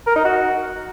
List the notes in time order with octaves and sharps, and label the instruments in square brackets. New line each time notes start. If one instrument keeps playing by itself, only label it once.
[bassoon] A#4
D#4
F#4